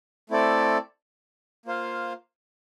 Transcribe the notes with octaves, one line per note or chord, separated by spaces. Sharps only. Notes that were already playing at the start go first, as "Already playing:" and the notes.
A3 C4 E4 A4 D5
A#3 F4 C5 F5